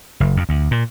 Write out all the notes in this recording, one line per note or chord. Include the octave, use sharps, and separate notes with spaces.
F#1
F2
D2
A#2